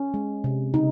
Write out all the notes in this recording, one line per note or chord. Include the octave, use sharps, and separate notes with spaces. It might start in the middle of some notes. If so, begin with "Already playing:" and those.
Already playing: C#4
G#3
C3
C#3 D#4